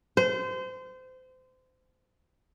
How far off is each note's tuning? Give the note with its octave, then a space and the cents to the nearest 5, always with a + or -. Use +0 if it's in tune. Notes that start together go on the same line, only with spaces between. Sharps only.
C5 -30